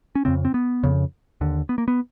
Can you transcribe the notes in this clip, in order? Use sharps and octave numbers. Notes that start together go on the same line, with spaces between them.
C#4
F2 C#3 C4
C4
B3
F2 C#3
D#2 D3
B3
A#3
B3